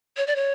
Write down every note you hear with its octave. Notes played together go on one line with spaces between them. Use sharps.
C#5
D5
C#5